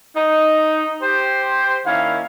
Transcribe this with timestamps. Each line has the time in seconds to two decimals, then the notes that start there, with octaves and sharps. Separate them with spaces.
0.16 D#4
1.02 G4 C5
1.86 D#3 A#3 C#4 E4 F5